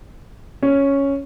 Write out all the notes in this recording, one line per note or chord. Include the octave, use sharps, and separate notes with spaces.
C#4